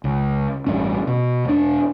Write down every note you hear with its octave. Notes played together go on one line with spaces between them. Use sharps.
C#2
D1 A1 G2 C#4
B2
E1 D4